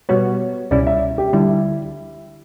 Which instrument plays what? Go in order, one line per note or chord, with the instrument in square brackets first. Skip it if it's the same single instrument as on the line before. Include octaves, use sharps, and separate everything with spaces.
[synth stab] B2 G3 B3 F#4 [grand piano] C#5
[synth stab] C#2 B2 G3 C#4 E4 [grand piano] D5
[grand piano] E5
G4
[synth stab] D2 D3 G3 [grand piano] E4